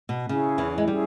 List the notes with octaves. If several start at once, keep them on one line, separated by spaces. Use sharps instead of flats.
B2
C#3 C#4 E4 G#4
E2 E3
G#3
G3 C#4 E4 G#4